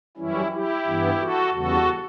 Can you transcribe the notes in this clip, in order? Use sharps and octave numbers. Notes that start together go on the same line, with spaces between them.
F#2 E3 G3 C#4 E4
E4 G4
G2 E3 B3
F#4 A4
E2 C#3 G3 B3 F#4 A4